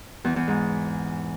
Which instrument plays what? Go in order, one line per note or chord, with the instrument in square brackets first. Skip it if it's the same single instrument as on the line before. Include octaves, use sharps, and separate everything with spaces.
[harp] E2
E2
G#2